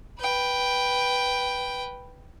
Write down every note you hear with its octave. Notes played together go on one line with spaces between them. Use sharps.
B4 G5